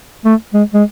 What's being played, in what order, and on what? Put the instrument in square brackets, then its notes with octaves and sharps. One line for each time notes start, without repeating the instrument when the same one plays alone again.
[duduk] A3
G#3
G#3